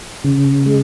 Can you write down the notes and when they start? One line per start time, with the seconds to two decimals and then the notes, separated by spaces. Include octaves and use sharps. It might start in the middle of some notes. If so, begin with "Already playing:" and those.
0.24 C#3
0.66 G#3